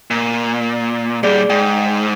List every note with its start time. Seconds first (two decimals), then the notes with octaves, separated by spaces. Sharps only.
0.11 A#2
1.23 A#2 G3 G#4 D5
1.50 G#2 G5